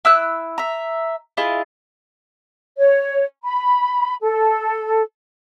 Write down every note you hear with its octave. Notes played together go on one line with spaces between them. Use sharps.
E4 E6 F#6
E5 A#5
E4 F4 G#4 D#5
C#5
B5
A4